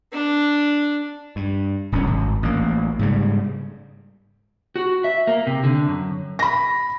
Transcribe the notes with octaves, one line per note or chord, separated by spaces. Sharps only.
D4
G2
D1 C2 F2 C#4
G#1
A1 A#3
G#2 C#3 G3
F#4
E5
A#3
C3
D3
F#2
B5 A#6